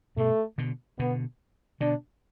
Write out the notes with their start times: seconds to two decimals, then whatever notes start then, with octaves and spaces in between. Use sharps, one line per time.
0.17 G2 B2 A3
0.58 B2 D3
0.99 B2 D3 B3
1.80 B2 D3 D4